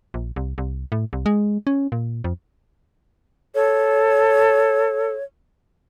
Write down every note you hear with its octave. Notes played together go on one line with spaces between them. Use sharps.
A#1
C2
C2
A2
C2
G#3
C#4
A#2
F2
A4 C#5